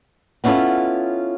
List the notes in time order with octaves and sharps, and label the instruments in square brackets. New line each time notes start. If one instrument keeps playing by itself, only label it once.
[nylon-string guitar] B3 C#4 D4 E4 F4 A4